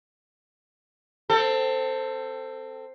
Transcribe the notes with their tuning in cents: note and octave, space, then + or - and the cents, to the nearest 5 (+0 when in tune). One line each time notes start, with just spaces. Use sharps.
C4 +0 A4 +20